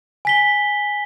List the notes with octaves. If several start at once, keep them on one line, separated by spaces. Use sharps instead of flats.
G#5 B6 G7